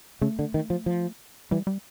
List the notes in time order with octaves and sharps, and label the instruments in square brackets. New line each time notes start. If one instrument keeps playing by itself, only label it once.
[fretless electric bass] C#3 [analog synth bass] A3
[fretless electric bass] D3
D#3
F3
F3
[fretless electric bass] E3 [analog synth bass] G3
[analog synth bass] G3